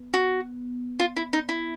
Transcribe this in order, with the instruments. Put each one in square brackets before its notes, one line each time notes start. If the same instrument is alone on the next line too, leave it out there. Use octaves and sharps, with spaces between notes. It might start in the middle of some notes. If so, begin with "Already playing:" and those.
Already playing: [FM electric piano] B3
[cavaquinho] F#4
F4
E4
D#4
E4